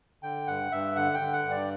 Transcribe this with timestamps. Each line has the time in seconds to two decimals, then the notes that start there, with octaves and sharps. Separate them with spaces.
0.23 D3 G5
0.47 G2 F#5
0.72 G2 E5
0.95 D3 F#5
1.14 G5
1.20 D3
1.33 F#5
1.44 G2
1.51 D5